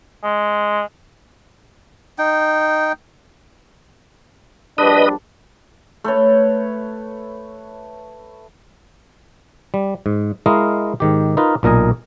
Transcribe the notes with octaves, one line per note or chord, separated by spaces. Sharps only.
G#3
D#4 G5
A#1 G3 D4 B4 D#5
A3 B4 C#5
G3
G#2
G#3 E4 A#4 D#5 F5
G#2 D#3 G4
D#4 F4 A#4 B4
B1 A#2 A#4 D#5 G#5